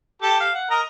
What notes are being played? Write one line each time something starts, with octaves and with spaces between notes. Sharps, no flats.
G4 A4 A5
F5
F#5
A#4 D#5 A#5